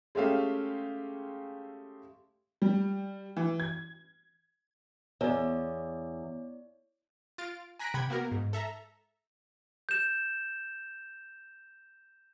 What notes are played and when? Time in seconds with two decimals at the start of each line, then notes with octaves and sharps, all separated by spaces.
0.15 G#3 A3 C#4 G4 E5 F5
2.62 G3
3.37 E3
3.60 G#6
5.21 E2 C#5 D5
7.38 F4 F6 A6 D7
7.79 G#5 A#5 F#6 A#6 B6 D7
7.94 C3 F#5 G5 B5 G#6
8.10 A#3 B3 F#4 A#4
8.31 G#2
8.53 A4 E5 A#5
9.89 G6 E7